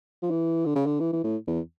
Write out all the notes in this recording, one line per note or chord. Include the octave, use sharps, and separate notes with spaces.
F3
E3
D3
C#3
D3
E3
E3
A2
E2